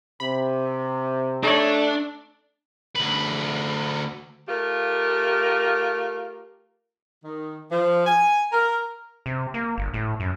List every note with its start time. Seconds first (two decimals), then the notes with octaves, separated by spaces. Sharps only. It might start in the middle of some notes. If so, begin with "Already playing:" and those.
0.20 C3 B5
1.43 A3 D4 D#4 C#5
2.95 D2 B4
4.49 A3 F4 G4 A#4
7.24 D#3
7.71 F3
8.06 G#5
8.52 A#4
9.26 C3
9.54 A#3
9.78 G1
9.94 A2
10.20 F#2